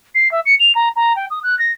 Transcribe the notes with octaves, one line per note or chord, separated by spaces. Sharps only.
C7
E5
C#7
F7
A#5
A#5
G5
D#6
F#6
A#6